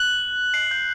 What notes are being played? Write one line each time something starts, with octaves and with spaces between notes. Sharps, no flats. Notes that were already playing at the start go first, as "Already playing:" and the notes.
Already playing: F#6 F#7
C7
G6